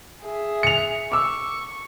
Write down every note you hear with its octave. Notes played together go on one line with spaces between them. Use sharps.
G#4 E5
C#7 F7
C#6 D6 E6